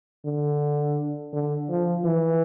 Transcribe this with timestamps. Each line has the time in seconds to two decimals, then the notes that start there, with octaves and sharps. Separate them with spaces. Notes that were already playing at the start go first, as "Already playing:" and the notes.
0.25 D3
1.33 D3
1.69 F3
2.04 E3